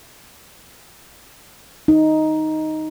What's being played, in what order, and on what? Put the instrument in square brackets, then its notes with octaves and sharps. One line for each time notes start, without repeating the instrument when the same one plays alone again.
[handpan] D#4